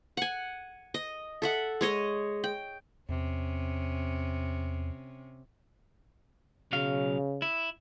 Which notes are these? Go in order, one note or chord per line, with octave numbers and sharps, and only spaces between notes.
F#5 G#5
D#5
A4 E5 F#5
G#3 C#5 D#5
G5
E2 C3 C#4
B1 C#3 F#3 F5
E4